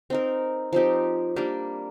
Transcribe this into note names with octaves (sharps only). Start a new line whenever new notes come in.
C4 D#4 A#4
F3 C4 D#4 G4
G3 A#3 D4 G4